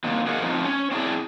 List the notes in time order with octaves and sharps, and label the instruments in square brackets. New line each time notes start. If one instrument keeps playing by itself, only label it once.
[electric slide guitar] D3 D#3 F#3 A#3 C4
F#4 G#4 A#4 D#5 F5 F#5
F3 F#3 A3 C4 D#4 F4
C#4
C4 D4 E4 F#4 G#4 D5